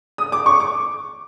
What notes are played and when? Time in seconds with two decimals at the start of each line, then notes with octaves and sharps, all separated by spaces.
0.18 D#6
0.32 D6
0.46 C#6
0.60 D6